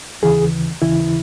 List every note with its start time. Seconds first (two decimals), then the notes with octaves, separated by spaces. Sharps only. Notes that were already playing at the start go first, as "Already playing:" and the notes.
0.22 D#2 C#3 E3 G#4
0.82 D#2 C#3 E3 E4